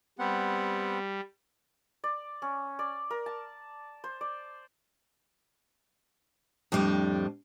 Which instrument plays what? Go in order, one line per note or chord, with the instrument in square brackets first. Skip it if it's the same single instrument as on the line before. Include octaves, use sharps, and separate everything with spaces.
[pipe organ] G3 [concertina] B3 C4 F#5
[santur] D5
C#4
D5
A#4
A5
C5
D5
[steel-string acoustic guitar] F2 A2 G3 D4